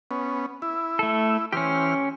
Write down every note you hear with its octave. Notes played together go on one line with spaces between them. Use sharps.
B3 C#4
E4
A3 A4
E3 C#4 G4 C5 F6